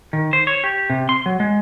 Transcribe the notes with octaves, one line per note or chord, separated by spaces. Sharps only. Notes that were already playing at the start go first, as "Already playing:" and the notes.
D#3
C5
C#5
G4
C3
C6
F#3
G#3